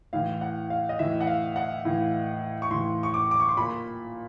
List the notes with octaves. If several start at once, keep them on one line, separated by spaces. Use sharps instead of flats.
A2 E3 F5
F#5
F5
D#5
A2 E3 E5
F#5
F5
F#5
A2 E3
C#6
A2 E3 C6
C#6
D6
D6
C#6
C6
A#2 B5